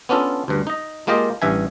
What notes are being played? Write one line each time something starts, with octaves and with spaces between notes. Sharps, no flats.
B3 C#4 D4 F4 A4
D2 G2
D#4 D#5
G#3 A#3 F4 G4 D#5
A1 G2 E5 G#5